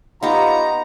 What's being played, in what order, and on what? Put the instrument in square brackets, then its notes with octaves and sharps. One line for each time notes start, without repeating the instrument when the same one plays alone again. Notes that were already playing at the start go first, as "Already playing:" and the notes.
[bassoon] B3 [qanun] D#4 G4 [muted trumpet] F4 [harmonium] A#5